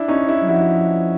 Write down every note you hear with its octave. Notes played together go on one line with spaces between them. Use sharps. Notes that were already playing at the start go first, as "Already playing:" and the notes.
Already playing: D4 E4
C#4 D#4
D4 E4
F#3
F3 E4 F#4